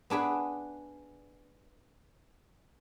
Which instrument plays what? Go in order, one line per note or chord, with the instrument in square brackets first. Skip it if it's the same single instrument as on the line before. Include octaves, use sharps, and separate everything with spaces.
[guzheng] B3 D4 G#4 B4